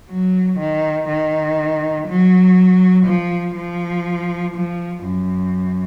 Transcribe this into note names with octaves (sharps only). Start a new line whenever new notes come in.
F#3
D#3
D#3
F#3
F3
F3
F3
F#2